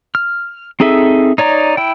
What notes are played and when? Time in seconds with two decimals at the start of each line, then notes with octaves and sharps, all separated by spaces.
0.15 F6
0.80 C4 D#4 G#4 A4 E5
1.38 D#4 C#5 D5 A#5
1.77 E4 G5